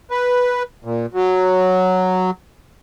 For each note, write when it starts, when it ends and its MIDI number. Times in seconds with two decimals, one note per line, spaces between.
0.11 0.63 71
0.85 1.06 46
1.13 2.31 54